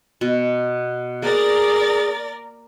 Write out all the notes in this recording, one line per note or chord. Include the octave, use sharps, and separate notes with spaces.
B2
A#3 G#4 A#4 D5 A6